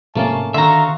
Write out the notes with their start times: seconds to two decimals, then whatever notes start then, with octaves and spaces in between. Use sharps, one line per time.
0.16 G#2 C3 F3 A3 A#3 C#4 F5 A5
0.54 D3 D#3 F#4 E5 F5 A#5 C6 C#6